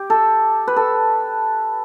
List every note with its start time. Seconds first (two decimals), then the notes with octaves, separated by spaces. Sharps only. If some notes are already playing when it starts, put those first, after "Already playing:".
Already playing: G4
0.10 A4
0.68 B4
0.76 A4